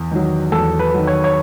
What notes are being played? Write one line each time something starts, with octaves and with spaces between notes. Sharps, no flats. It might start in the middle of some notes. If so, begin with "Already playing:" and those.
Already playing: E2
D#3 F#3
E2 A4
B4
D#3 F#3
C#5
C#5